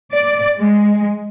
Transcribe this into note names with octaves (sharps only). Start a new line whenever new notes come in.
D5
G#3